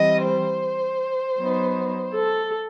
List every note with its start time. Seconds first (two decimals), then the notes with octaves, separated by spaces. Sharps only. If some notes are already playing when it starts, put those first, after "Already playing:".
Already playing: E3 G3 C4 D#5
0.24 C5
1.38 F#3 B3 D#4
2.15 A4